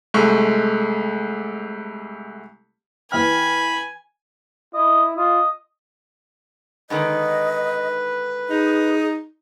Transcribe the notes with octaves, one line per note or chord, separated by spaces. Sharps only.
C2 G#3 A3 C#6
E3 G5 G#5 B5 F6
E4 D#5
F4 D#5
G#2 D3 D#3 B4 D#5
D#4 G#4